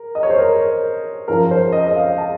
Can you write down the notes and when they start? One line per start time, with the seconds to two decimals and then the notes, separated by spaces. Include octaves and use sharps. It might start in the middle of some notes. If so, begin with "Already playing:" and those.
Already playing: A#4
0.15 D#5
0.23 C#5
0.30 C5
0.38 A#4
1.28 F#2 F3 A#4
1.51 C5
1.72 D#5
1.87 D#5
1.96 F5
2.18 A5